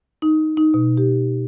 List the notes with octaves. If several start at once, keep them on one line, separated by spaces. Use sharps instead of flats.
D#4
D#4
B2
G4